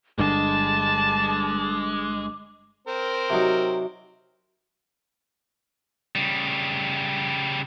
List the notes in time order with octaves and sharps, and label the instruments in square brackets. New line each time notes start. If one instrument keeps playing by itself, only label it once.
[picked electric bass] G1 G2 D3 [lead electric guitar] G#3 [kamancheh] A5 [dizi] D6
[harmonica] C4 A#4 C5
[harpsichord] C3 F#3 D#4
[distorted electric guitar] C#3 G3